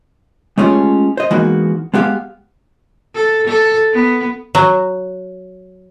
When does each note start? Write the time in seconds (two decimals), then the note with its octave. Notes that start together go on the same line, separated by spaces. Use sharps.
0.58 G#3 A3 C#4 F4 G4 G#4
1.17 C5 D#5
1.31 E3 G#3 A#3 B3 D#4 F#4
1.94 G#3 B3 G4 D5 F5
3.15 A4
3.47 A4
3.93 B3
4.55 F#3